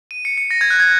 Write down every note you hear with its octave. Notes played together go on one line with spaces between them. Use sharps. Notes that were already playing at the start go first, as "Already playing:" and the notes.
D#7
C#7
C#7
A#6
G#6
F#6
G#6